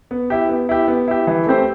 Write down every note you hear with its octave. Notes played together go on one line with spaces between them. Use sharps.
B3
E4 G4
B3
E4 G4
B3
E4 G4
E3
A3 C4 G4 C5